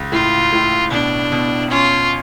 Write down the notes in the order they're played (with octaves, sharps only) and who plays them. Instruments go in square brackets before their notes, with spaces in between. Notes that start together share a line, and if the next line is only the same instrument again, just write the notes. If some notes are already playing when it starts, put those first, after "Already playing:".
Already playing: [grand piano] C#2
[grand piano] A2 [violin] F4
[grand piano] A2
[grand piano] B2 [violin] D4
[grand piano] B2
[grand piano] C#4 [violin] F4